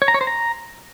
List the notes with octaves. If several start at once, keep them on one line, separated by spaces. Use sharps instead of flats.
C#5
A#5
C#5
C5
A#5